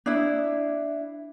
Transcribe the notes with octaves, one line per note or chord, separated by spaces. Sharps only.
D4 E4